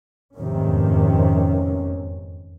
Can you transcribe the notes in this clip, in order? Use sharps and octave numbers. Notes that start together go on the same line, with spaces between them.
F1 E2 G#2 C3 D#3 C#4